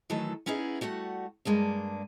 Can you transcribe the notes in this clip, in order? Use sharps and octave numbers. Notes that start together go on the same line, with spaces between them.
D#3 E3 F#3 A3 A4
B3 C#4 D#4 E4 G#4
G3 A3 F#4 F#5
G2 G#3 A#3 D4